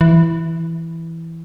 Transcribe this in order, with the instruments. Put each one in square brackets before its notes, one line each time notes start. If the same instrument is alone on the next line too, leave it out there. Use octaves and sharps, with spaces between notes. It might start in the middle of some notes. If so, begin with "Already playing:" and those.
[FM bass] E3